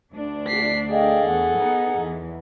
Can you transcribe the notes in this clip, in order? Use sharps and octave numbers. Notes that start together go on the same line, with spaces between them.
D2 D4
B6 C7
G#4 A4 D#5 F5 G5
E2 F#5
B3 D#4
E2